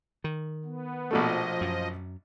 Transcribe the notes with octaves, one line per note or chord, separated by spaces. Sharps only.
D#3
B3
A#1 B2 F3 A3 D#5
F#2